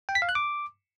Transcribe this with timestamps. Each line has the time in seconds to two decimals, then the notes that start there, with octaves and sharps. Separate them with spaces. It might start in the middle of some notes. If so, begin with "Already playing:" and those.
0.09 G5
0.15 B6
0.22 F5
0.29 F#6
0.35 D6